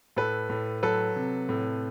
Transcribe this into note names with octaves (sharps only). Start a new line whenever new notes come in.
A2 A4 B4
A2
F#3 A4 B4
C3
A2